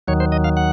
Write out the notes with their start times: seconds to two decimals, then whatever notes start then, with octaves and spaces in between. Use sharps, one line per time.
0.08 D#2 D#3 F#3 C#5
0.20 C5
0.32 D#5
0.44 F5
0.57 F#5